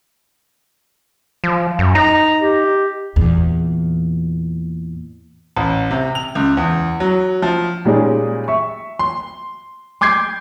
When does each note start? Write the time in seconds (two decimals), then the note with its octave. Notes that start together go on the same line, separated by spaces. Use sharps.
1.44 F3
1.79 F#2
1.95 D#4 A#5
2.42 G4
3.16 E2 A#2
5.57 A1
5.91 C3
6.15 F7
6.35 C#2
6.57 E2
7.00 F#3
7.42 F3
7.85 A#2 G3 G#3 C#4 D#4 G#4
8.48 E5 C#6
8.99 C6
10.01 C6 D6 G6 G#6 C7